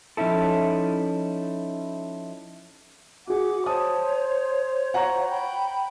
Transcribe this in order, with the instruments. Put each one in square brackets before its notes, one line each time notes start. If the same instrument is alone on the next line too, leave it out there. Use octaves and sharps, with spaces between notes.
[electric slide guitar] F3 C#4 D#4 E4 A4
[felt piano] F#4 G#4 [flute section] F#5 D6
[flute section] C5 C#5 [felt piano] A5 D#6
[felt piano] F#5 A#5 C#6
[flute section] G5 B5 G6